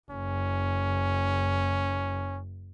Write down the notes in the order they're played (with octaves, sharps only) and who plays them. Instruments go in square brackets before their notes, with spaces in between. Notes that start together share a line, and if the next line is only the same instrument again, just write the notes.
[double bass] F#1 [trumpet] C#4